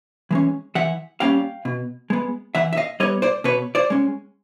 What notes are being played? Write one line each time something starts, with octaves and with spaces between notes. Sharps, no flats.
E3 G#3 C#4
E3 E5 F#5
G3 A#3 C#4 F5 G5
B2
G#3 B3
E3 E5 F#5
E5
D#5 F5
G3 B3 C#5 D#5
C5 D5
B2 B4 C#5
C5 D5
G#3 C#4